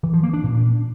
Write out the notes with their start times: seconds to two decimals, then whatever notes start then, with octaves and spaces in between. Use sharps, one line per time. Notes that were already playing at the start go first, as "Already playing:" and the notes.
0.03 E3
0.13 F3
0.23 A#3
0.33 D4
0.44 A#2